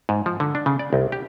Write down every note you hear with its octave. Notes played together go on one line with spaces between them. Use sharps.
G#2
F3
D3
D4
C#3
D5
C2
G4